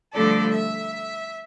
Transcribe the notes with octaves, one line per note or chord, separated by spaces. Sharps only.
D3 F3 G3 A3 A4 D5
E5